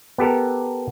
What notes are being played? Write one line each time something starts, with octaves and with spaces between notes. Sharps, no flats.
B3 G4 A4 A#4